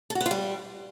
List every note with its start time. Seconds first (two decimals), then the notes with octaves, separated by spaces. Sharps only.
0.10 A4
0.15 F#4
0.21 B3
0.26 F4
0.31 G3